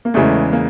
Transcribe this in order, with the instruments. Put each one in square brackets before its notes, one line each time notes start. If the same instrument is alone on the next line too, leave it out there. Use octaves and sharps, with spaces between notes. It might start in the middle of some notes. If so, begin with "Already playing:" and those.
[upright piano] A#3
[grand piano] E2 C#3 E3 G#3 [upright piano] A3
[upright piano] A#3